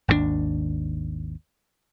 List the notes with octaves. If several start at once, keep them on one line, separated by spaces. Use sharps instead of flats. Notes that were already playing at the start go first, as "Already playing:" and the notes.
G#1 D#2 C3 D4